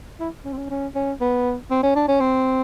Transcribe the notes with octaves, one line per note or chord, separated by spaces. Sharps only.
E4
C#4
C4
C#4
C#4
C#4
B3
C4
C#4
D4
C#4
C4